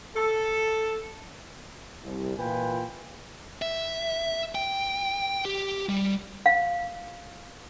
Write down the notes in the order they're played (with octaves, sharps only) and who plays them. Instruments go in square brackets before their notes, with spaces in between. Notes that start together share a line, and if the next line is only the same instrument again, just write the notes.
[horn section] A4
[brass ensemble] C2
A#2 E3 F4 B4 G5 G#5
[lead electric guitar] E5
G5
G4
G3
[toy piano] F5